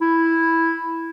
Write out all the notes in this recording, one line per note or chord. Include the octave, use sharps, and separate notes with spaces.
E4